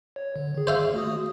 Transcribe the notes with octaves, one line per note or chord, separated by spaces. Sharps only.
C#5
D3
D#3 G#4
C5 E5 F5
A3 F#4 D#6